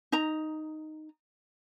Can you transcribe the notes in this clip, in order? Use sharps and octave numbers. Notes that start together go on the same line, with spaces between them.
D#4 A#5